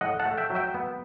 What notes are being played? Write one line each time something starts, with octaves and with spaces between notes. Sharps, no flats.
A2 D#5 F#5
F#5 A5
A3
E5 G5
F#3
E5 G5
B3